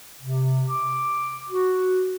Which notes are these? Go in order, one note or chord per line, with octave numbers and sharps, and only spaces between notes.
C3
D6
F#4